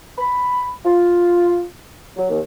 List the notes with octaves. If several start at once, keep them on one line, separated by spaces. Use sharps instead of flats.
B5
F4
F#3
D#2